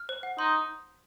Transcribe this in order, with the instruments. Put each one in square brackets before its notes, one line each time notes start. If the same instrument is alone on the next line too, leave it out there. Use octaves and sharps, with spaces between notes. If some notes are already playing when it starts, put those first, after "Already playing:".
Already playing: [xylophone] F6
C5
F#5
[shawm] D#4 [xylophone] C6